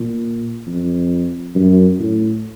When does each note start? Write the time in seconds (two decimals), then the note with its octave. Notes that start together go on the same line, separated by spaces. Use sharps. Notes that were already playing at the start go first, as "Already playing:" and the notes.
Already playing: A#2
0.66 F2
1.55 F#2
1.99 A2